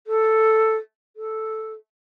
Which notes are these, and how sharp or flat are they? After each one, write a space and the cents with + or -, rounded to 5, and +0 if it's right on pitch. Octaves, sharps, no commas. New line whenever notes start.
A4 +5
A4 -5